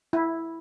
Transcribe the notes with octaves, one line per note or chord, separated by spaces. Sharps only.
E4